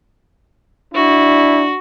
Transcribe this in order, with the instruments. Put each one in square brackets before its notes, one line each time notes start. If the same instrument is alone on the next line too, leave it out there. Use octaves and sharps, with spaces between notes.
[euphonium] D4 [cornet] E4 [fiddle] F#4